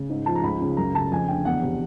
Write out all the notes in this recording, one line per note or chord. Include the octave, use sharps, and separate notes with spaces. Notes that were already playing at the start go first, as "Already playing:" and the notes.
Already playing: C#3
G#2
F3 A5
A#5
C#2 B5
C#3
F#2 A#5
C#3 A5
F2 G#5
D3 G5
E2 F#5
C3